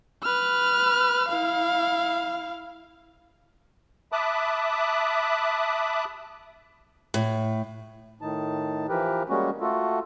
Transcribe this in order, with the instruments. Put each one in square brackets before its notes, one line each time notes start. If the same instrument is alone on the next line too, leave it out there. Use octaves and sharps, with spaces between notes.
[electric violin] B4 F6
E4 F5
[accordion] E5 A5 B5 D6 D#6 F#6
[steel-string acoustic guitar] A2
[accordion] A2 D#3 D#4 A5
E3 F3 G4 A#4 B4
G3 G#3 A#3 C#4 F#4
A3 F4 F#4 A4